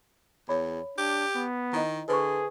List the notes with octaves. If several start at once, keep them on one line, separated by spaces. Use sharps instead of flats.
E2 C#5 B5
D4 G4
B3
D#3 E4 C5 D#5
D3 G#4 B4 C5 C#6